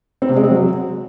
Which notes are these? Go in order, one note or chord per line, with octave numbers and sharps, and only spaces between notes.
C4
C3
G#3
C4
F#3